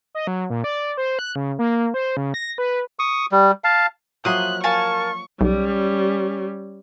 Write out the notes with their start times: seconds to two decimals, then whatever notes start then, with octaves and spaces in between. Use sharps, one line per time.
0.15 D#5
0.27 F#3
0.50 A#2
0.64 D5
0.97 C5
1.19 F#6
1.35 C#3
1.59 A#3
1.94 C5
2.17 C#3
2.34 A#6
2.58 B4
2.99 C#6 D#6
3.32 G3
3.64 F5 A5
4.25 F3 F#3 A#3 E5 C6 D#6 F#6
4.64 F4 A#4 G#5 A5 C#6
5.41 B1 G3 C#4